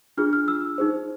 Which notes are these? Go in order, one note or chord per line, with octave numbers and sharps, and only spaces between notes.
D4 F4 G#4 F6
F6
E6
D#4 G#4 C5